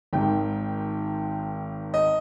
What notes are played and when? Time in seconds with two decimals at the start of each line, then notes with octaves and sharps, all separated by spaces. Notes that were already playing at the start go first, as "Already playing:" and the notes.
0.13 G#1 G#2 D#3 G5
1.94 D#5